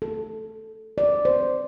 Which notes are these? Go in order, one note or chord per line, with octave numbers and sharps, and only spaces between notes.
A4
D5
C5